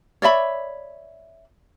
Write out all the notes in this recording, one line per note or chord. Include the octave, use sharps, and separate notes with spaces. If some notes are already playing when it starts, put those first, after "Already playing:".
C#5 D5 E5 B5